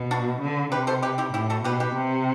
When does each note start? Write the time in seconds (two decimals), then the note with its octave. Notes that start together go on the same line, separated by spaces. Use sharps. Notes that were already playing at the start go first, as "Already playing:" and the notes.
Already playing: B2
0.11 D4 F#4
0.41 D3
0.72 C3 G4 B4
0.87 A4 C5
1.03 G4 B4
1.18 E4 G4
1.34 A2 E4 G4
1.50 F#4 A4
1.64 B2 G4 B4
1.80 G4 B4
1.96 C3